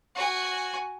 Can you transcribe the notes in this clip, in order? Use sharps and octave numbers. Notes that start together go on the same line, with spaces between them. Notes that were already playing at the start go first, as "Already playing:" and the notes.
F#4 G#5